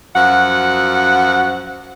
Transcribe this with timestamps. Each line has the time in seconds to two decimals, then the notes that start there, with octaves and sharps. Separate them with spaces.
0.15 F#2 F3 F#4 F#5